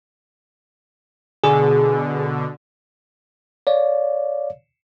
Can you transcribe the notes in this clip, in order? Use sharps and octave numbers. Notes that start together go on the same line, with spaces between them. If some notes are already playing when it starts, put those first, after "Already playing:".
B2 D3 G#4
C#5 D5 F5